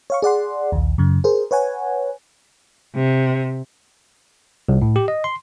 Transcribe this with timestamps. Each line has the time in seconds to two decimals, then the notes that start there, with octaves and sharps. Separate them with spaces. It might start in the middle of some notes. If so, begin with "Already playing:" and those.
0.10 C#5 F5 C#6
0.22 G#4 D5 F#5 C6
0.72 A#1 D#2
0.98 F#2 C#3
1.24 G#4 A#4 C5
1.51 B4 C#5 F#5 G#5
2.95 C3
4.68 C2
4.82 A2
4.96 G4
5.08 D#5
5.24 C6